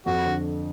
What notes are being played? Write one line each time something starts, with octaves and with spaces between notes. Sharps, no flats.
F2 F#4
D3